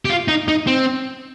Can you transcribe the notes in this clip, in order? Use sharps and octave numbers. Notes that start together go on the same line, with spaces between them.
G4
F4
D#4
D#4
C4